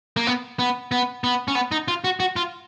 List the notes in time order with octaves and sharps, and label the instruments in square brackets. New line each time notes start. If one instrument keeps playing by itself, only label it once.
[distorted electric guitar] A#3
B3
B3
B3
B3
C#4
B3
D#4
F4
F#4
F#4
F4